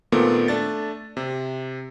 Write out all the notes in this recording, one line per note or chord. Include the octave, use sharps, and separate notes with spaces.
A#2 D#3 A3 B3 C4
A3 D4 A6
C3